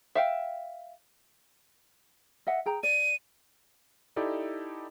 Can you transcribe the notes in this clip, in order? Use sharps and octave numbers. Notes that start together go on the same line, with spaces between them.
E5 F5 G5
D#5 E5 F#5
G#4 G5 A#5
D5 D#7
D#4 E4 G4 A4 D5 D#5